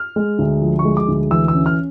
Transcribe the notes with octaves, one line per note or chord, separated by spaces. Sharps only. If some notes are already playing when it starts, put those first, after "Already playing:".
Already playing: F6
G#3
D2
F3
C#6
G#3
D6
D2
E3 E6
E6
C#4
F6